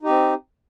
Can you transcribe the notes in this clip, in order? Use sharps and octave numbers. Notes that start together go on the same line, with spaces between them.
C4 D#4 G4